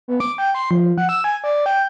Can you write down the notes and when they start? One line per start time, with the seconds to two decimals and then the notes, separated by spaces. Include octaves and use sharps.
0.08 B3
0.20 D6
0.38 G5
0.55 C6
0.71 F3
0.98 F#5
1.09 E6
1.24 G#5
1.44 D5
1.66 G5